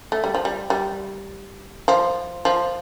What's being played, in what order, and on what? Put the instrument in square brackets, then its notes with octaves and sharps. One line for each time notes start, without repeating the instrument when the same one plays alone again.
[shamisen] A3
G3
F3
G3
G3
F3
F3